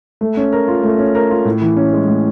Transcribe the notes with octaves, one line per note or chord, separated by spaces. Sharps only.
A3
C#4
A#4
F4
A3
C#4
A#4
F4
A2
E3
C#4
G#3
A2